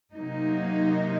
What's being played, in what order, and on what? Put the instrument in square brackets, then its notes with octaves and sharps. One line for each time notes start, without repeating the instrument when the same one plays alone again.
[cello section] C3 F#3 A#3 D#4